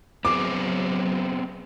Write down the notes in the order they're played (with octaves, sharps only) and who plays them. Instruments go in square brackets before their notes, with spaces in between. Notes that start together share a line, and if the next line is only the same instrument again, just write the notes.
[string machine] F#3 [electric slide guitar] B3 C4 G#4 [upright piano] D6